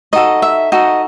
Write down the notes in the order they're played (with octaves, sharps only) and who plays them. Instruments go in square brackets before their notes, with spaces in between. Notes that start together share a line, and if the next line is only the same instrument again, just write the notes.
[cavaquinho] D#4 F#4 A4 D#5
E5
D#4 F#4 A4 D#5